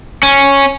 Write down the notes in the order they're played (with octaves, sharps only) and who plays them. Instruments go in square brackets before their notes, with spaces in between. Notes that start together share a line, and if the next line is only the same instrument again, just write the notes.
[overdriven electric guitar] C#4